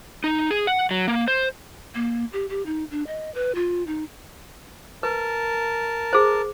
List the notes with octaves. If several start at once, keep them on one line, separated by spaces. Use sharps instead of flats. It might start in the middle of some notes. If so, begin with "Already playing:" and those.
D#4
G#4
F#5
F#3
A#3
C5
A#3
G4
G4
D#4
D4
D#5
B4
F4
D#4
A#4 B4 A5
G#4 C5